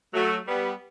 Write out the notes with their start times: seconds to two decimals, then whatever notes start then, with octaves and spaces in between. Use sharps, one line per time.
0.13 F#3 A3
0.47 G3 B3